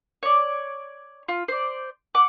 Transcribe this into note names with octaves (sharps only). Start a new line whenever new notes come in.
C#5 D5
F4
C5 D5
F#5 D6